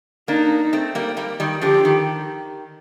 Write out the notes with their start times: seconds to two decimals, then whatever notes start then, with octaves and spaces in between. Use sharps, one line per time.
0.28 A#3 D4 D#4
0.73 A3 C4
0.95 G3 A#3
1.17 G3 A#3
1.40 D#3 G3
1.61 D3 F3 G4
1.85 D#3